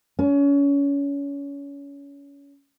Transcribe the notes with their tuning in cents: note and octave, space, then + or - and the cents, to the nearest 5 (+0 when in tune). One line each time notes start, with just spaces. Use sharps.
C#4 +25